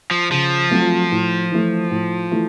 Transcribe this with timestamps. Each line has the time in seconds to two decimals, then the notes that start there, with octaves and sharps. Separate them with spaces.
0.11 F3
0.30 C#3 F3
0.71 F#3 A3 C4 F4
1.12 A2
1.52 E3 A3
1.91 A2
2.31 E3 A3